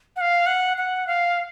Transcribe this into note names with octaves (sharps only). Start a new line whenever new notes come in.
F#5
F5
F#5
F#5
F5